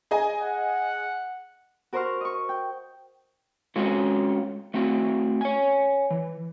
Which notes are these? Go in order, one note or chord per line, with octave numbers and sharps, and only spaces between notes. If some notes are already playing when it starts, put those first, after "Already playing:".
G#4 D#5 G#5
F#5
F#4 A#4 C5 C6 C#6 F6
D#5 C#6
G5
G#3 C4 C#4 F4 F#4 A4
A3 C4 F#4
C#5 G#5
E3